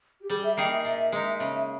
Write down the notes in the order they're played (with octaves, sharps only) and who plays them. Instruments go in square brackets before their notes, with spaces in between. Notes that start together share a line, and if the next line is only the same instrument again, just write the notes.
[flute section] G4
[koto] G3 [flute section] G#4
[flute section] E5
[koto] A#3 D#4 G#4 [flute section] G5
[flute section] E5
[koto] A#2 [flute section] E5
[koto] G#3 D#4
C#3